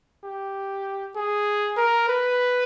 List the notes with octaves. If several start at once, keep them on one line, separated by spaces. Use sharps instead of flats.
G4
G#4
A#4
B4